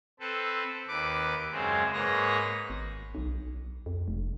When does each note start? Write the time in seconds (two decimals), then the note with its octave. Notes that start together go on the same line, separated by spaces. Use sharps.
0.20 C4 A4 B4
0.88 D#2 B4 D6
1.52 F#2 C#3 G#3 C4
1.93 G#2 A#3 G#4 B4 C#5 A#6
2.70 G#1
3.15 B1
3.86 F2
4.08 F1